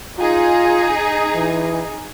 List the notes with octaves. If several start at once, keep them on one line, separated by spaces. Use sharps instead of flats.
D#4 F4 G#4
E3